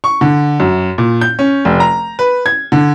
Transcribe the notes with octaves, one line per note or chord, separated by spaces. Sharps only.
C#6
D3
F#2
A#2
G6
C#4
F1
A#5
B4
G#6
D3